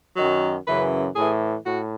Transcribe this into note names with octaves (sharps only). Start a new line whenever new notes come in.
F#2 D#3 F#3
F#2 C#3 E3 B4
A2 E3 G#4
A2 F#4